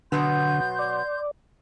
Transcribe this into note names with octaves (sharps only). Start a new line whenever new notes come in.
B2 D3 F#3 B3 C6 G6
D5